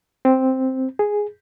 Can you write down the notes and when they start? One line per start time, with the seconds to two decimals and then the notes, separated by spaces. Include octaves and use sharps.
0.25 C4
0.99 G#4